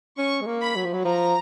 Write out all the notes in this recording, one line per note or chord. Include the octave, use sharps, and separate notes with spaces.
C#4 C#6
G#3
A#3
B5
F#3
F3
F#3
F3 A#5